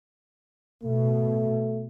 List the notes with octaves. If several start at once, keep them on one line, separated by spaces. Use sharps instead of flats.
B2 A3